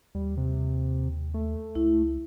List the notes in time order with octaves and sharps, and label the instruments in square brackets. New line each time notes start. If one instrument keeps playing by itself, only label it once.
[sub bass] D#2 [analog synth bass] G3
[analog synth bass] C3
A3
[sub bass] C#2 [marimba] E4